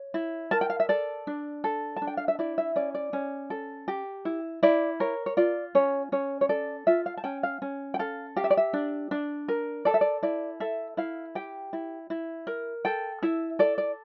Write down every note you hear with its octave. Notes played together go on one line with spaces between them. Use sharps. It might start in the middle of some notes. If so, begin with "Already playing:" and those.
Already playing: C#5
E4
A#4 A5
G5
F5
E5
A4 D5
D4
A4
A5
D4
G5
F5
E5
E4 D5
E5
C#4 D5
D5
C#4
A4
G4
E4
E4 D5
A#4 C#5
C#5
F4 D5
C#4 C#5
C#4 C#5
C#5
A4 D5
F4 E5
F5
A5
C#4 G5
F5
C#4
G5
A4 F5
G4 F5
E5
D5
E5
D4
D4
A#4
A4 D5
E5
D5
E4 D5
A4 E5
E4 F5
G4 G5
E4
E4
A#4
A4 G5
E4 E5
A4 D5
D5